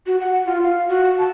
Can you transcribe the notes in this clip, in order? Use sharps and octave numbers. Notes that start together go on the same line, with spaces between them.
F#4
F#5
F#5
F4
F5
F#4
A5